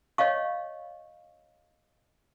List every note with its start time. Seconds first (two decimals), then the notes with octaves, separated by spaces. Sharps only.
0.18 C#5 D#5 F5 C#6